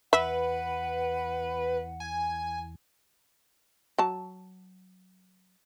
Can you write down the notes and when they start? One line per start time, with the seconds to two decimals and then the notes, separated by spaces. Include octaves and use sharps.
0.13 E2 B4 E5 F#5
2.00 G#5
3.98 F#3 A5